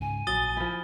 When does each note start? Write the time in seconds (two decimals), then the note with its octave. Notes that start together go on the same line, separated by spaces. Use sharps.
0.01 C#2 G#2 G#5
0.27 A#1 F#3 D#6 A6 G7
0.57 F3 E4